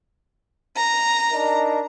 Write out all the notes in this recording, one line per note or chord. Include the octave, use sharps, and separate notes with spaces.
A#5
D4 D#4 A#4